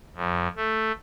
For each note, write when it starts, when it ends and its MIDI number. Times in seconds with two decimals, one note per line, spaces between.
0.15 0.48 41
0.56 0.92 57